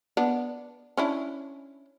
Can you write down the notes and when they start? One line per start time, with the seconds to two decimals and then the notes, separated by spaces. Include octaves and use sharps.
0.17 B3 D4
0.97 C#4 D4 E4